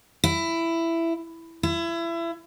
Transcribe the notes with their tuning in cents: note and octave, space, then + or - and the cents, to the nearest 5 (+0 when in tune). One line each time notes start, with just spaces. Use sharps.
E4 +10
E4 +30